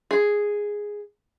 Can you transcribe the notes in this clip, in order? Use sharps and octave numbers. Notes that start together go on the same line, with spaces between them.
G#4